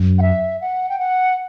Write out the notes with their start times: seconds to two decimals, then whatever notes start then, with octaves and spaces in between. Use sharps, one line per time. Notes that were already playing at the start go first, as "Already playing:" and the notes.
Already playing: F#2
0.19 F#5
0.22 E5
0.61 F#5
0.89 G5
0.99 F#5